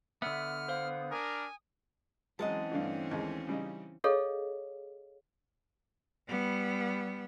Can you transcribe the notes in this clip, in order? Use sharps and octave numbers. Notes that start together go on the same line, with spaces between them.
D3 B3 E5 F6
C5 F5
D4 A#4 G#5 D#6
E3 F#3 G#3 C4 C#4 D#5 F#5 A5
G2 D3 A3 D4 F5
D#2 G#3
C#3 G3 D#4
G#4 A4 C#5 D#5 F5
G3 B3